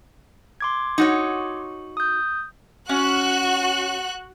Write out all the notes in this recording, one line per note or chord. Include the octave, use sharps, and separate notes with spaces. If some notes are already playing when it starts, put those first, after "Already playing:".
C6 D6 G#6
D#4 F#4 C#5
D#6 G6
C#4 F#4 F#6